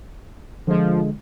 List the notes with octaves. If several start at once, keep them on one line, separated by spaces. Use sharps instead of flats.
D3 F3 G#3